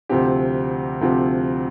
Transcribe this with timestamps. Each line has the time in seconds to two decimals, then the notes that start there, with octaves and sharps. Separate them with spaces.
0.09 D2 C3 F3 C4 G4
1.01 D2 C3 F3 C4 G4